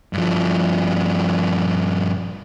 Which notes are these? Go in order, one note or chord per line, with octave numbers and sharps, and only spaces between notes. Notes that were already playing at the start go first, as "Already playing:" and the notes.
G2 F3